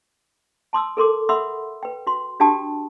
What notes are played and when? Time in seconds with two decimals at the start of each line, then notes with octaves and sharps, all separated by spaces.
0.73 A5 C6 D#6 E6
0.97 A4 A#4 C6 D6
1.29 E5 F#5 B5 C6 D#6 E6
1.83 B4 G5
2.07 F#4 C6
2.40 D4 F#4 G4 G5 A5 D#6